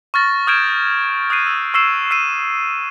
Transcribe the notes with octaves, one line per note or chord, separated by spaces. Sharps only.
C#6 F6 A6 A#6
D#6 F6 G6 G#6 D7 E7
D#6 F#6 C7 D#7
E6
C#6 E6 C7 E7
E6 C7 D#7